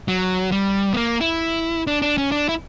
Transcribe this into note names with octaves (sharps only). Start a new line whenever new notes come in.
F#3
G3
B3
A#3
E4
D4
D4
C#4
D4
E4